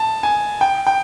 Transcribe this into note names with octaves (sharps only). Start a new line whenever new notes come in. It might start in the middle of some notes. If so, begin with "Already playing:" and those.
Already playing: A5
G#5
G5
G5